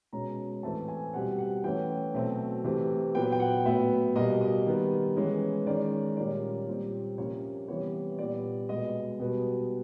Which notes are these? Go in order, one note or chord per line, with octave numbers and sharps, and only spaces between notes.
B2 G#3 C#4 A#5
A2 E3 A3 C4 A5
G#5
B2 G3 C4 F#5
F#5
E3 A3 C#4 G5
B2 F#3 A3 C4
C3 E3 A3 C4
A#2 F#3 B3 G5
G5
F#5
A2 F#3 B3 E5
B2 G3 A#3 D#5
D#5
D#3 G3 B3
E3 G#3 C#4
D#3 G#3 C#4 D5
A#2 G3 A#3 C#4 D5
A#2 G3 C4
C3 F3 A#3 C#4 C#5
C3 E3 G3 B3 C#5
A#2 G3 B3 D5
B2 G#3 B3 D#5
B2 G3 B3